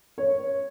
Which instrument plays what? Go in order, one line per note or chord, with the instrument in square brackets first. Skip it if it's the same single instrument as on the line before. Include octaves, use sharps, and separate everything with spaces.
[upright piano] C#5